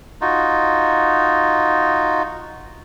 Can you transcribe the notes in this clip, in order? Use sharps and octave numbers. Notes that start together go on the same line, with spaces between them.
D#4 F4 F#4